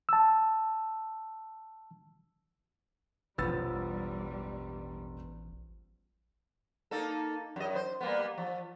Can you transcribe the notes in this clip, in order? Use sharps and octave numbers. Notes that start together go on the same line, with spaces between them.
A5 E6
E1 A1 F3 G3 B3 E6 A6
A#3 D#4 A4
F#2 D#5
C5
G3 A#3 B3
F3